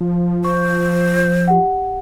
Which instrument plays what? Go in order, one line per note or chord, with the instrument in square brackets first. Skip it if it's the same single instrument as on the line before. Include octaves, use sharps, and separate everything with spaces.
[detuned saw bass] F3
[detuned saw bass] F3 [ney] C5 [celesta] C#6
[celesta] G4 F#5